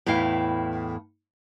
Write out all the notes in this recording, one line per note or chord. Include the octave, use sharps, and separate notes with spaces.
E2 A2 E4 F5 G5